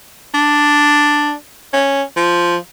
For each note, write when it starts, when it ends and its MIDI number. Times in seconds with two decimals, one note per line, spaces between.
0.34 1.33 62
1.73 2.02 61
2.17 2.56 53